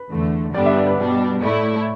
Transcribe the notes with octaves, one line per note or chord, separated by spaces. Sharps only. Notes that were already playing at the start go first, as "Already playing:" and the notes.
Already playing: B4
E2 D3 A3
G2 D3 G3 B3 D4 D5
E5
D5
B4
B2 G3 D4
A2 A3 E4 D5